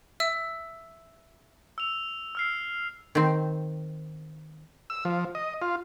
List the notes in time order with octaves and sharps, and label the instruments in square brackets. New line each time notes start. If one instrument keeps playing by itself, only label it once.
[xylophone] E5 E6
[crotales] E6 F7
E6 F6 C7
[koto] D#3 C4
[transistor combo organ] E6
F3
D#5
F4